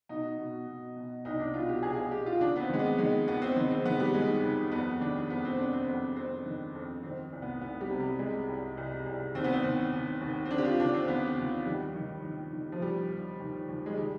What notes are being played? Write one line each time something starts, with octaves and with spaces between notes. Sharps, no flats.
B2 D#4
B2
B2
B2
C2 D#4
D4
B2 F4
G4
B2 G#4
G#4
B2 G4
F4
D#2 D4
B3
C4
D#3 G#3
B3
D#3 G#3
D#2 B3
C4
D#3 C4
C4
D#3 B3
G3
D#2 G#3
D#2
F2 B3
D#3 D4
F2 B3
C4
F2 D4
C4
F2 B3
F2 C4
D#3
F2
D#3 C4
C2
B3
C2 B3
G3
C3
G3
C2 G#3
C2
C2
C2
D#2 C4
B3
C4
D#2
D#2
D#2
C4
D3 D4
G4
F4
D#2 D4
C4
D#2 B3
D#2
D#3 G3
D#3
D#3
D#3
F3
D#2 G3
D#2
D#2
D#2
G#3
D#3 G3